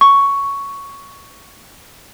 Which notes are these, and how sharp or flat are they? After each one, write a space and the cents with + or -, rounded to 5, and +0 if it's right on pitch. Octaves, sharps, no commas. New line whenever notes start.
C#6 +5